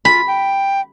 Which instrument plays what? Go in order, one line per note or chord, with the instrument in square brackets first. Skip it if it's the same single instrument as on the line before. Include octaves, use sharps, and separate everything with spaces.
[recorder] F4 [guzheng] B5
[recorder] G5